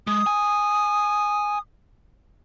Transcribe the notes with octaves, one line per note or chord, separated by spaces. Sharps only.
G#3 D#6
G#5